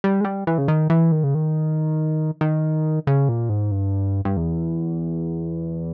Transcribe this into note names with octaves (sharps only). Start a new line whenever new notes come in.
G3
G#3
G3
E3
C#3
D#3
E3
D#3
C#3
D#3
D#3
C#3
A#2
G#2
G2
G2
E2